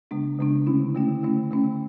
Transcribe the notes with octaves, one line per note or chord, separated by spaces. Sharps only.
C#3 G#3 B3 D4
C#3 G#3 B3 D4
D3 A3 C#4 E4
D3 A3 C#4 E4
D3 A3 C#4
D3 A3 C#4